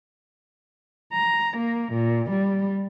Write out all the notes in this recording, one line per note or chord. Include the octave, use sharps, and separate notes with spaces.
A#5
A#3
A#2
G3